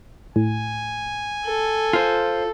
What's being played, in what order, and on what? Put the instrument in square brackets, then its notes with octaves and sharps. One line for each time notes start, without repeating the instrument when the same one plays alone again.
[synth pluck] A2 [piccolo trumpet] G#5
[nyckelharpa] A4
[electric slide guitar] F4 C5 [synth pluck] F6